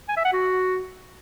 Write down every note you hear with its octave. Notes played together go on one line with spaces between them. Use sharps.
G#5
E5
F#5
F#4